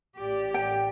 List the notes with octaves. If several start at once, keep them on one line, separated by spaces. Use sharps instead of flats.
A1 G4 D5
G5